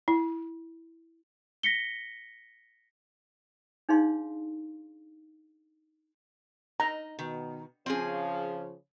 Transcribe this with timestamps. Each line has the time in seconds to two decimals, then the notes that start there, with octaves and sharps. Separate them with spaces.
0.08 E4
1.63 A#6 B6 C#7 G7
3.89 D4 D#4 G#4 C#5 F5 C6
6.80 D#4 A#5
7.19 B2 D#3
7.86 C#3 F3 C4 C#4 G#4